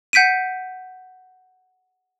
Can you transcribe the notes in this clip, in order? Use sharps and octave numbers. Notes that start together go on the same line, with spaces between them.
F#5 G6 B6 D7 D#7